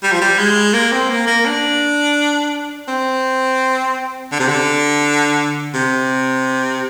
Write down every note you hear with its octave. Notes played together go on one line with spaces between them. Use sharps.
G3
F3
G3
G#3
A#3
C4
A#3
A#3
D4
C4
D3
C3
D3
C3